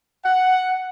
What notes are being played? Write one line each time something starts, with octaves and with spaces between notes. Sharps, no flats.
F#5